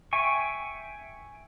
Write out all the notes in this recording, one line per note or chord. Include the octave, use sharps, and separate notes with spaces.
E5 G5 G#5 C#6